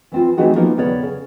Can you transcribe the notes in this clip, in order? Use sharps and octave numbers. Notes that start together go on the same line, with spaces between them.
E3 C4 F4
E3 A3 C4 D#4 F#4 G#4
F3 A#3 B3 C#4 D#4 F4
D#2 C#3 B3 C#5 D5
C#3